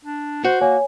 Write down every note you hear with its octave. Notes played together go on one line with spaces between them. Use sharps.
D4
F#4 C5
A#3 C#5 G#5